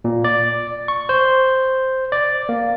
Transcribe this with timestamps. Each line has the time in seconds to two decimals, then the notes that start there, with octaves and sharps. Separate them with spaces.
0.04 A#2
0.24 D5
0.88 C#6
1.09 C5
2.12 D5
2.49 A#3